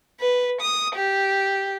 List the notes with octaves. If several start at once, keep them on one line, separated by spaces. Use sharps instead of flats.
B4
D#6
G4